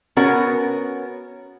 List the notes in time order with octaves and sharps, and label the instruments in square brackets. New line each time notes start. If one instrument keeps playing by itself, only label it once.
[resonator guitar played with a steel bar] B3 C#4 F#4 A#4